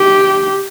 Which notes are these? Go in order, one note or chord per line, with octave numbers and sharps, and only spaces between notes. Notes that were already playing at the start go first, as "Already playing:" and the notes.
Already playing: G4